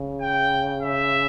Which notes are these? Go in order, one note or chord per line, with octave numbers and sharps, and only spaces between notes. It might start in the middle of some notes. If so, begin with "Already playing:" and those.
Already playing: C#3
G5
E5